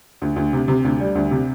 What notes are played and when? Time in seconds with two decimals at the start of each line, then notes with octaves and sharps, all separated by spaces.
0.22 D2
0.36 D2
0.53 C3
0.68 C3
0.85 D2
1.00 G3
1.15 D2
1.31 C3